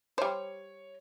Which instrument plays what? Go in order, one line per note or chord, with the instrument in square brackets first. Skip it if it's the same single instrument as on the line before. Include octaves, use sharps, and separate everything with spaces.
[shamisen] G3 C5 [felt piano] C#5